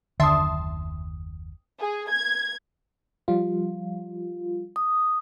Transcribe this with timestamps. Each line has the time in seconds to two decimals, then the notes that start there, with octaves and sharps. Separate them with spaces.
0.20 F#1 D#2 D3 E5 G5 A5 C6 D#6
1.81 G#4
2.10 G#6
3.28 F3 G3 F4
4.76 D#6